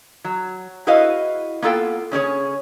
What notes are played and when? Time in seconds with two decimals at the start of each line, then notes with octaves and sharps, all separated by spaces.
0.24 F#3
0.87 E4 F#4 G#4 B4 D#5 F5
1.62 A#3 B3 F4 A4 F5 G5
2.12 C#3 C#4 G#4 C#5